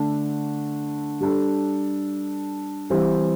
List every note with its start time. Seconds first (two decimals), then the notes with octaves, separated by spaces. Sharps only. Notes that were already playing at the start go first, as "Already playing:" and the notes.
Already playing: D3 A3 D4
1.21 G3 D4 A4
2.90 E3 G3 C4